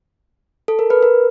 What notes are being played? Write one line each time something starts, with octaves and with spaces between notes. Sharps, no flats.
A4
A#4
B4
A#4